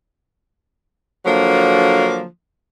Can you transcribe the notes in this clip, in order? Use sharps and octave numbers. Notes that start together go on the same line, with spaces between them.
D3 F3 F#3 A#3